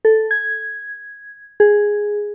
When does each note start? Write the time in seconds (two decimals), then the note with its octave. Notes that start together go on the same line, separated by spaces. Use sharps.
0.05 A4
0.31 G#6
1.60 G#4